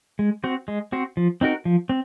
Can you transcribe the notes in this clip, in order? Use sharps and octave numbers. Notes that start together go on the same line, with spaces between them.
G#3
C4 F#4 C5
G#3
C4 F#4 C5
F3
C4 D#4 F#4 A#4
F3
C4